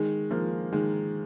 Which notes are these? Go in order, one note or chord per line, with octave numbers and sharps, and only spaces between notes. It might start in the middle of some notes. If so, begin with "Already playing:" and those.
Already playing: D#3 G#3
F3 A#3
D#3 G#3